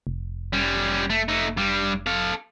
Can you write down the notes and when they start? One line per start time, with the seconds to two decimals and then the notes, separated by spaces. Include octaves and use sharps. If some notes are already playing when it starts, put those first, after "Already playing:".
0.07 F1
0.53 G3 C#4
1.10 A3
1.28 A3 D#4
1.57 G2 G3
2.07 A4 F5